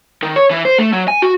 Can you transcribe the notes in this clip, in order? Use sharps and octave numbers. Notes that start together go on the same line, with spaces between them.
D#3
C#5
E3
C5
A3
F#3
G#5
F#4